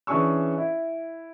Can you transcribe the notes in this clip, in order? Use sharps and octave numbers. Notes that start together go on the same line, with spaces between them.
E3 C#4 D4 G#4 C#6 E6
E4